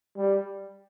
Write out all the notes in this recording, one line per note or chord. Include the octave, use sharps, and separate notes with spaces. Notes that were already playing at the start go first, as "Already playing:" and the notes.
G3